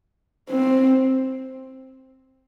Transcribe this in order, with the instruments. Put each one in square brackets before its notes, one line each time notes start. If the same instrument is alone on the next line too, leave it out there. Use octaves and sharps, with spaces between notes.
[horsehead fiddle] C4